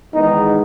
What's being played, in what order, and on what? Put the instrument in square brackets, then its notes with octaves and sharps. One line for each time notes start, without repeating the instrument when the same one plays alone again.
[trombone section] E2 D#3 G#3 B3 D#4